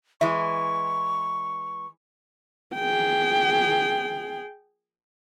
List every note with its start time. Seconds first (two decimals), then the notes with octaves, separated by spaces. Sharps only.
0.21 E3 G#3 E5 C#6
2.74 G#4 G5